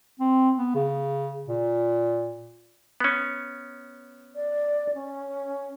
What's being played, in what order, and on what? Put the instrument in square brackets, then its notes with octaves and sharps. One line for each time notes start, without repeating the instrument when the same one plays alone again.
[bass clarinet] C4
B3
C#3
A#2
[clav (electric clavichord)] B3 C#4
[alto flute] D5
C#4